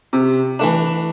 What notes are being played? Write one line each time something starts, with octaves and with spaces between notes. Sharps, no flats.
C3
E3 A3 D4